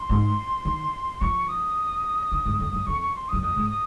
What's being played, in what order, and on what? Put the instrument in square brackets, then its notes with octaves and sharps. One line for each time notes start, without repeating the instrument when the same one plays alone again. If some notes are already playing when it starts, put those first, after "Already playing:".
Already playing: [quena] C6
[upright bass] G#2
D#3
[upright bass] F3 [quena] C#6
[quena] D#6
[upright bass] D#3
G#2
F2
F#2
[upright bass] F2 [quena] C#6
[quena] C#6
C6
[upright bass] F#2 [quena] D#6
[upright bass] F2 [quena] D#6
[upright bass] G#2
[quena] D#6